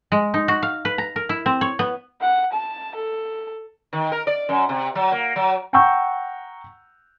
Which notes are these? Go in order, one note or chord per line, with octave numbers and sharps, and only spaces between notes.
G#3
D#4
F#4
F5
B4
A#5
A#4
E4
C4
C#5
B3
F#5
A5
A4
D#3
A#4
D5
F#2
C3
F#3
A#3
F#3
F#5 G5 A#5 C#6 E6 G6